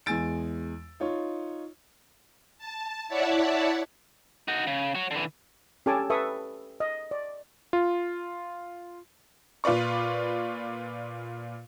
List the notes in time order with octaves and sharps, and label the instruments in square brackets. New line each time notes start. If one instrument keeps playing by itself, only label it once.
[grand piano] E2 G#3 G#5 E6 A6 D7
D#4 F4 C#5
[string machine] A5
E4 C#5 D5 E5 F#5 A5
[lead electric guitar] D#4 F#4
C#3
F#4 C#5
D3 E3
[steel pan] C#4 G4 A4 G#5 A5 D6
A4 B4 E5 C#6 D#6
D#5
D5
[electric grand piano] F4
[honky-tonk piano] A#2 F4 B4 D5 C#6